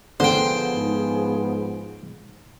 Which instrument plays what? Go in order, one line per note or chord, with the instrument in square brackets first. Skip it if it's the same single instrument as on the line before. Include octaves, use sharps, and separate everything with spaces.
[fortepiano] D3 [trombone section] F3 B3 G#4 [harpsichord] C5 G5
[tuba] G#2